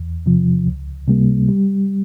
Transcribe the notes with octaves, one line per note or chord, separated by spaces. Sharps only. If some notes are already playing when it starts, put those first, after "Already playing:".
Already playing: E2
C3 F3
C#2
C3 G3 A#3
G3